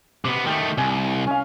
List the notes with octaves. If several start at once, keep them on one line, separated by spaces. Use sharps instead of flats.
C3 B3
D#3 A3 G4
C2 G#5
C#4 F5